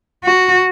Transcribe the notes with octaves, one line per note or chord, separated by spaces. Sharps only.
F#4